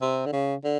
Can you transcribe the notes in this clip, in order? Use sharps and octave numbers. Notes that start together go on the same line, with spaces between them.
C3
D3
C#3
D3